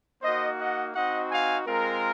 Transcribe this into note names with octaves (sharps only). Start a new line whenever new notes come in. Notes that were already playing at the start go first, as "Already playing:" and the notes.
A#3 D#4 F#4 C5 D#5
D#5 F#5
C4 D#4 F#4 D#5 F#5
F5 G#5
G#3 C4 F4 A#4